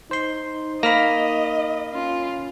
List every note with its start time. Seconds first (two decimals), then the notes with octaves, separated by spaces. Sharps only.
0.11 D#4 C5 C6
0.83 A#3 D#5 B5 F6 A#6
1.93 C#4 F4